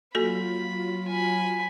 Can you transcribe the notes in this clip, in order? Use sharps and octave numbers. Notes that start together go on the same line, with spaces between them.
F#3 A#3 F4 F#4 A4 B5
G#5 B5